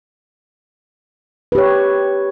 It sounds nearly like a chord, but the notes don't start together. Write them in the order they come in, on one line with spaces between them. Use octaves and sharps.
B4 G4 C#5